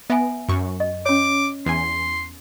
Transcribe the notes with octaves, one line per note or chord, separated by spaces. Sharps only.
B3 E5 G#5
F#2 C#6
D#5
C#4 C#5 D6
E2 G#5 C6